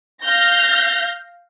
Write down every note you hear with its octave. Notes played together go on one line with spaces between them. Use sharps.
F5 F6 G6 A#6